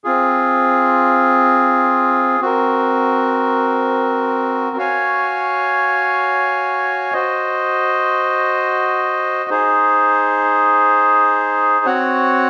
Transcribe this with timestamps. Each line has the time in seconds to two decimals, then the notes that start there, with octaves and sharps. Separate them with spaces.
0.04 C4 F4 G#4
2.40 C4 F#4 A#4
4.76 F#4 C#5 F5 G#5
7.13 F#4 C5 D#5
9.50 D#4 G#4 C5
11.85 C4 F#4 C#5 F#5